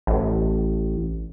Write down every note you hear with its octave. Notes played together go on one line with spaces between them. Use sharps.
A1